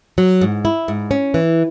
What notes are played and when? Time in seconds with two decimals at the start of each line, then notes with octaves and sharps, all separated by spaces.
0.18 F#3
0.41 G#2
0.65 E4
0.88 G#2
1.11 C#4
1.34 E3